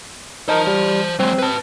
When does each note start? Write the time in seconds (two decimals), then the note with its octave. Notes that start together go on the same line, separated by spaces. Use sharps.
0.49 D#4 A#4 C5 A5
0.67 G3
1.20 F#3 G#3 C4
1.39 B4 A5